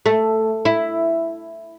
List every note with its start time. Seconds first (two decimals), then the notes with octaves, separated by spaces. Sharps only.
0.06 A3
0.65 E4